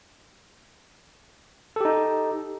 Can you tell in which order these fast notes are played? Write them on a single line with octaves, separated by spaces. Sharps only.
A4 G4 D#4